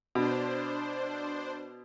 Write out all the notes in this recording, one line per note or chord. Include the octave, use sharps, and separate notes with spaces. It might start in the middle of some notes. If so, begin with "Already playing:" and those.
B2 D4 C5